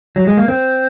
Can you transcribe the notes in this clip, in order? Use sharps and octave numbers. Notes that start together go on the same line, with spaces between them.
F#3
G#3
A#3
C4